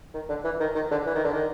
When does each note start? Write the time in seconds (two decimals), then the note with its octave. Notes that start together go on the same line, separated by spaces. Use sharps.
0.14 D#3
0.29 D3
0.44 E3
0.60 D#3
0.75 D#3
0.91 D3
1.06 E3
1.15 D#3
1.24 D3
1.33 D#3